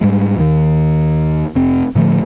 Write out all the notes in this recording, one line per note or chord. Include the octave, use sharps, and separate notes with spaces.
G#2 G3 G#3
D#2 D#3
F1 C4
A2 D3 F3 A3